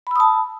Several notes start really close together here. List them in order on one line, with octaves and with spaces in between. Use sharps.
B5 E6 D#6 A5